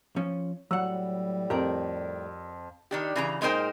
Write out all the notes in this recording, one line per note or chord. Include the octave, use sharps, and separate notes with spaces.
F3 C#4
A2 F#3 G3 F#5 E6
F2 G4 A#4 D5
D#3 D4 G4
C#3 E3 A#5
A#2 G#3 D#4 A#4 C5 G5